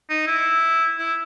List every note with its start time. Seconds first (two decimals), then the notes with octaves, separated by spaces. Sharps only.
0.10 D#4
0.27 E4
0.98 E4